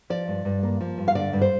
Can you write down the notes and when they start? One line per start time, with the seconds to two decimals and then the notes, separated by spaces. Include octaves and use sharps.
0.10 F3 D5
0.28 G2
0.45 G2
0.63 A#3
0.81 F3
0.98 G2
1.08 F5
1.15 D3 D5
1.33 G2
1.41 C5